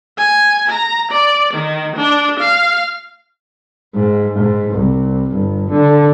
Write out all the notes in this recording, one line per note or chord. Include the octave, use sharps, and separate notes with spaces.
G#5
A#5
D5
D#3
D4
F5
G#2
G#2
C2
G1
D3